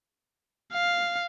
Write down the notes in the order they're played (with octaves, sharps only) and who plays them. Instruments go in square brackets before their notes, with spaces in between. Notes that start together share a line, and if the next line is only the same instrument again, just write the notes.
[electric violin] F5